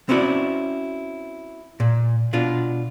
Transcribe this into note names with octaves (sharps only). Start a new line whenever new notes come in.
C4 C#4 E4 F#4 D5
A#2
B2 D4 F4